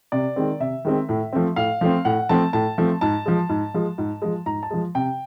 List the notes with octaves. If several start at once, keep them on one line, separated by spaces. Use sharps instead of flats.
C3 D5
D#3 G#3 C4
C3 E5
D#3 G#3 C4
A2
F3 A3 C4
A2 F5
F3 A3 C4
A2 F#5
F3 A3 C4 A5
A2 A5
F3 A3 C4
G#2 A5
F3 G#3
G#2
F3 G#3
G#2
F3 G#3
G#2 A#5
A5
F3 G#3
C3 G5